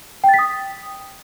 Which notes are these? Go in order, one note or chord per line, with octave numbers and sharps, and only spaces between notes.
G5
A6
B6
D#6